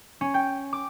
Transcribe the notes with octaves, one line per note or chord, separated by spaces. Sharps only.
C#4
G5
D6